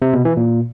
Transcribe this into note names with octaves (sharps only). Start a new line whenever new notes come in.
C3
B2
E3
A#2